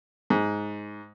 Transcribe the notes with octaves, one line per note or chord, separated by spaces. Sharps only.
G#2